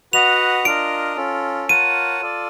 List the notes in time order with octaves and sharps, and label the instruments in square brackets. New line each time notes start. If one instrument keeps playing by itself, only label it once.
[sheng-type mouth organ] F#4 B4 D#5 F#5 [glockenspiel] F7
[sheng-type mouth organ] D4 F4 A#4 D#5 [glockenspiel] D7
[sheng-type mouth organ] C#4 F4 A4
[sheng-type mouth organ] F4 A#4 C#5 F#5 A5 [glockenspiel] D#7
[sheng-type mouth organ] F4 A4 D5